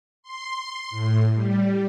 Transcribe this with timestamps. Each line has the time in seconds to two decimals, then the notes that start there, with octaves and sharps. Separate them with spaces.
0.23 C6
0.90 A2
1.34 G3